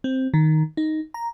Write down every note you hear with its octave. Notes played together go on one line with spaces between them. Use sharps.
C4
D#3
D#4
A#5